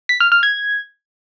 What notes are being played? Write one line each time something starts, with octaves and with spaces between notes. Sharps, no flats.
B6
F6
F6
G#6